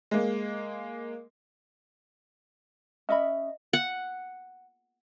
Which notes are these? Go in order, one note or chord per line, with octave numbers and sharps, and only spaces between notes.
G#3 A#3
C#4 D#5 E5 B5
F#5